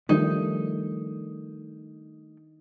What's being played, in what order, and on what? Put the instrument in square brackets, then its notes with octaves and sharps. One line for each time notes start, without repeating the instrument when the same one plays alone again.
[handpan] D#3 [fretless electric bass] F3 G3 A3 [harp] D#4